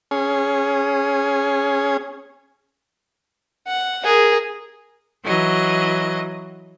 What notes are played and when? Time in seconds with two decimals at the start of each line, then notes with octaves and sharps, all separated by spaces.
0.11 C#4 G#4
3.67 F#5
4.04 G#4 A#4
5.25 E3 F#3 D#5